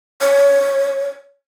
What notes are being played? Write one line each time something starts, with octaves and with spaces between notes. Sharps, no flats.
C#5